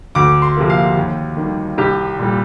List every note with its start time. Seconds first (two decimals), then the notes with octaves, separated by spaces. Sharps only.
0.15 D2 D6
0.42 C6
0.57 C3 F3 A#3
0.70 F5
0.97 D#2
1.37 D#3 G3
1.78 C2 G4
2.19 A#2 G3